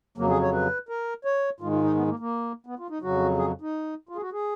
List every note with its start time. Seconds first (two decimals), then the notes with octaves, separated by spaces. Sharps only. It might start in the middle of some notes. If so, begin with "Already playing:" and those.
0.18 F2 C#3 F#3 A#3
0.30 G#4
0.42 C#5
0.53 B4
0.89 A#4
1.25 C#5
1.60 G#2 D#3 G#3 F4
1.72 F4
1.84 D#4
1.95 B3
2.08 A#3
2.19 A#3
2.66 B3
2.79 F4
2.90 D#4
3.02 F2 C#3 F#3 F#4
3.38 G#4
3.61 D#4
4.09 F4
4.16 G#4
4.21 F#4
4.33 G#4